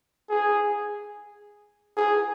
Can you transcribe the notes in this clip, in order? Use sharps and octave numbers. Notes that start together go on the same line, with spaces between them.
G#4
G#4